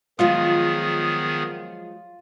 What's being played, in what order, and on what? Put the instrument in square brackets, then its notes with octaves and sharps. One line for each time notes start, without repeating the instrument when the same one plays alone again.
[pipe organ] D#3 B3 G#4 [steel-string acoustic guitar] F3 F#3 G#3 [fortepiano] F4